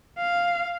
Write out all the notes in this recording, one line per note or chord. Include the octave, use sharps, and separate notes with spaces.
F5